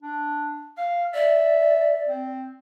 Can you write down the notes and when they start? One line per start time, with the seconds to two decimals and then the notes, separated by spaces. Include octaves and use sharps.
0.03 D4
0.77 F5 F6
1.13 D5 E5
2.08 C4